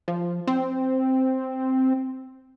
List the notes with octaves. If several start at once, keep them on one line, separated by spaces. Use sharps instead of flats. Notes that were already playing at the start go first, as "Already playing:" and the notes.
F3
C4